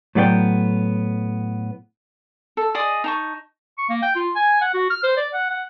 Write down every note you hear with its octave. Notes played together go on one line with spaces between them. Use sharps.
A2 F#3 B3 D5 F5 G5
A4
G#4 D5 D#5 D#6
D#4 A5 C#6
C#6
A#3
G5
F4
G#5
F#5
F#4
F6
C5
D5
F#5
F#5